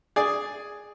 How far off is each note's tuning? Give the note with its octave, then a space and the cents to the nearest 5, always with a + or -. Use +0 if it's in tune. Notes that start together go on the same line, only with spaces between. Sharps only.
G#4 +0 D5 +0